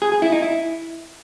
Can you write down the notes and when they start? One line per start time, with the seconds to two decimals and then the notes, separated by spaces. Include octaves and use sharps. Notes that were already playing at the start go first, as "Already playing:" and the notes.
0.02 G#4
0.12 G#4
0.22 E4
0.32 D#4
0.42 E4